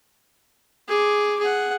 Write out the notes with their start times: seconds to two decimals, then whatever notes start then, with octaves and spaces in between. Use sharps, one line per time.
0.88 G#4 D6
1.39 G#4 F#5